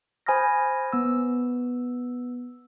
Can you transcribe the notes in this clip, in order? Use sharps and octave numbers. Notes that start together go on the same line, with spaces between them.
C5 G#5 B5 D#6 F6 A#6
B3 E6